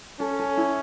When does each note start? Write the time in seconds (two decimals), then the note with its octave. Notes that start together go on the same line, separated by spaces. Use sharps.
0.20 C#4 A4
0.39 A4
0.57 E4